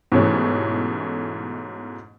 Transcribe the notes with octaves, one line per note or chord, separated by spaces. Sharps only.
G#2 B2 E3 A3 C#4 G4